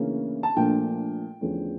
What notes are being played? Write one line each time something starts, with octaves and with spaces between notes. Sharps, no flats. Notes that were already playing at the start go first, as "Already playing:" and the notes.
Already playing: D2 C#3 E3 A#3 C#4
A5
A#1 A#2 F3 A3 D4 G5
E2 D3 F3 A3 C#4